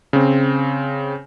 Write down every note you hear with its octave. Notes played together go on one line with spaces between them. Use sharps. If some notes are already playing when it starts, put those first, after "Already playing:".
C#3 C4